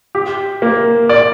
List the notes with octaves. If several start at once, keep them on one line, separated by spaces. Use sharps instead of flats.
G4
A#3
D5